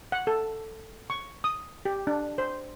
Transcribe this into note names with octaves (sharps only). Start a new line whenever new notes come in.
F#5
A4
C#6
D#6
G4
D4
C5